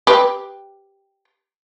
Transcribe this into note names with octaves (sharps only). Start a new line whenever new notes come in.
G4 B4